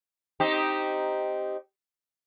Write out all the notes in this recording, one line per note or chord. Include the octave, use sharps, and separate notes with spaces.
C4 D#4 G4